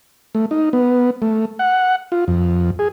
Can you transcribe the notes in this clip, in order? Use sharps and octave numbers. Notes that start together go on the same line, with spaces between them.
A3
D#4
B3
A3
F#5
F4
F2
G#4